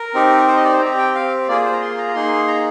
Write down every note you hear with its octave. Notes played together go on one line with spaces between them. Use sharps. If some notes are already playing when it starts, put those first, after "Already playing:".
Already playing: A#4
C4 D#4 G4
C5
D#5
D5
C5
C4 G4 A#5
G5
F5
A#3 F4 G#4 D5
C5
A#5
C6
A#5
A#3 D#4 G#4 C6
A#5